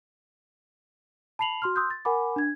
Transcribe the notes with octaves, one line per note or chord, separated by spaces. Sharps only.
A5 B5 C7 F7 F#7
F#4 C6 F6
C6 D#6 E6 F#6 G6
A6
A#4 F#5 G#5 B5 D6
D4 G#6